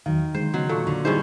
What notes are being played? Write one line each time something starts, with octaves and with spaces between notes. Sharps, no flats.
E2 D#3 F#3 F5
D3 G#3 C5
C#3 F#3 B3 D#4
A#2 A4 C#6
D3
G2 C#4 D#4 E4 G#4 C5